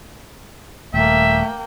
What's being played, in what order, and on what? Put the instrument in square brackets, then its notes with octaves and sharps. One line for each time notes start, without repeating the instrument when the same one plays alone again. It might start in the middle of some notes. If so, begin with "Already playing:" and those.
[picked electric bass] D#1 [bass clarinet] A3 [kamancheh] A#3 G5 [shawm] E5